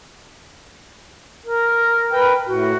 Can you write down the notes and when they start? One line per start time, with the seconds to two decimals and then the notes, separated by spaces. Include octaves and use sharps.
1.44 A#4
2.12 B4 G5
2.47 A2 F#4